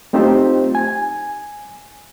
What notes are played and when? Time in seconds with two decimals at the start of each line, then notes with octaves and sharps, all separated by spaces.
0.13 A3 C4 D#4 F4 G4 C5
0.75 G#5